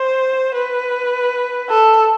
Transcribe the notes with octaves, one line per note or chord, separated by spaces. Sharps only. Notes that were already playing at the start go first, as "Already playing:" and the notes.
Already playing: C5
B4
A4